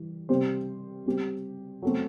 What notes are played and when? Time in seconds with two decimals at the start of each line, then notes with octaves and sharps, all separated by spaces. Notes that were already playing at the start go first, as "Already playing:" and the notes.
Already playing: E3 G3
0.29 C3 G3 C4 G4 C5
1.06 G3 C4 G4
1.82 F#3 A3 C4